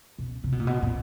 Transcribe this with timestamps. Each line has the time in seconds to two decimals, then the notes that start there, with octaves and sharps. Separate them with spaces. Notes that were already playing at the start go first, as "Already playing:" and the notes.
0.19 B2
0.44 C3
0.52 B2
0.60 A#2
0.67 B2
0.82 A#2